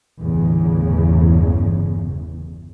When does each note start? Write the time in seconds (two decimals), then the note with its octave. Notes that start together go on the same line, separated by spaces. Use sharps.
0.20 G1 E2 A2 C#3